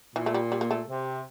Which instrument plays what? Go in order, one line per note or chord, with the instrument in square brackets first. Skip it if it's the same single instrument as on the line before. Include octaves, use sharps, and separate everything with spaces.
[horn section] A#2 [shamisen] E3
[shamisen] A3
G3
G3
A#3
A3
[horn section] C3